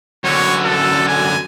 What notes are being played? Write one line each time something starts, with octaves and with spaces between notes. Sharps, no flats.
F#2 D3 C#5
A4
G#5